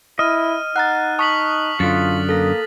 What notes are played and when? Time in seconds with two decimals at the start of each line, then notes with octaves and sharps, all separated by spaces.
0.19 E4 D#5 F6 D#7
0.76 D#4 F#5 A#5 F#6 A6
1.19 A5 C#6 D#6 B6 F#7
1.80 F#2 D3 F4 A6
2.29 A#3 A4 A#6